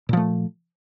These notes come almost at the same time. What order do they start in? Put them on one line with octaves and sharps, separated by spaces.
A#2 F3 A3